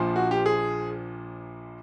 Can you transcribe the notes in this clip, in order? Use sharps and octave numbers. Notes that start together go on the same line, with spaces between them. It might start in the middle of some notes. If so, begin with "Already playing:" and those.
Already playing: A#1 A#2 F3
F#4
G4
G#4